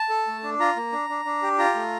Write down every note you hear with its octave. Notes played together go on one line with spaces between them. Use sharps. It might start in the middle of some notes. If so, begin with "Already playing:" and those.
Already playing: A5
A4
A3
D4
F4 A#5
A#3
D4
D4
D4
G4
F4 A#5
A3